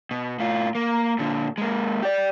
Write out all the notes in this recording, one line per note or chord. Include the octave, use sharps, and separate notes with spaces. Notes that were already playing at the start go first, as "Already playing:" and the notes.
B2
A2 F4
A#3
A#2 D3
G#3 A#3
G4 D5